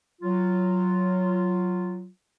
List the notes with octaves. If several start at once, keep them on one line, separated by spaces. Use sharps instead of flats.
F#3 F4